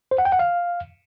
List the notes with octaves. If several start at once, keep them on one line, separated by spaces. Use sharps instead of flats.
C5
F#5
G5
F#5
F5